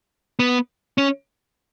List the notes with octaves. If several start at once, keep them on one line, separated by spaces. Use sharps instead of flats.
B3
C#4